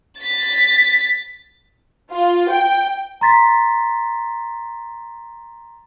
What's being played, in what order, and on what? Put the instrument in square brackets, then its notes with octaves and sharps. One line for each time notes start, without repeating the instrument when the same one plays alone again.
[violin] A6 B6
[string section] F4
G5
[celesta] A#5 C6 A6 B6